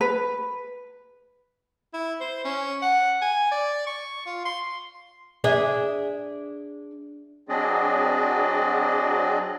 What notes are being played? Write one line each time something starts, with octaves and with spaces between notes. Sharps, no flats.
B4
E4
C5
C#4
F#5
G#5
D5
C#6
F4
C6
D4 G#4 E5
F#3 C4 D4 G#4 D5 D#5